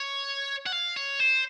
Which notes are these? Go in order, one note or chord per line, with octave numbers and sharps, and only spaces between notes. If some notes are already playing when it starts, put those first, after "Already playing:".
Already playing: C#5
F#5
F5
C#5
C5